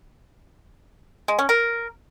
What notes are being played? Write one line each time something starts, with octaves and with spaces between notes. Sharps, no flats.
G#3
C#4
A#4